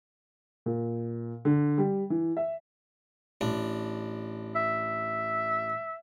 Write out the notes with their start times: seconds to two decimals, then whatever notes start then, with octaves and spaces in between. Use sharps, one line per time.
0.66 A#2
1.45 D3
1.78 G3
2.10 E3
2.37 E5
3.41 A1 D4
4.55 E5